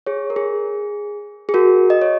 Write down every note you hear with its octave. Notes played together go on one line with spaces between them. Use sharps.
G#4 C#5
A#4
G#4
G#4
F#4 A#4
D#5
C#5